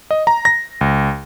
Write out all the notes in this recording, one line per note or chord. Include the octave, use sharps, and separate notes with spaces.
D#5
A#5
A#6
C#2